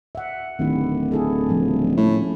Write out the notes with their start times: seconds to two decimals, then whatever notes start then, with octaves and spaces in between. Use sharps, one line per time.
0.15 E5 F#5
0.59 D1 D#3 E4 G4
1.12 E4 G#4 A4
1.48 C#3 F3 G3
1.97 A2 A#3 C#4